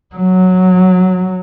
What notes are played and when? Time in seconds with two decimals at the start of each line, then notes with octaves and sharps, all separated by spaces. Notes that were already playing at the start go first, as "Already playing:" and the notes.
0.16 F#3